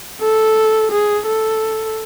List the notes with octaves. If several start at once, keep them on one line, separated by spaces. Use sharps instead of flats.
A4
G#4
A4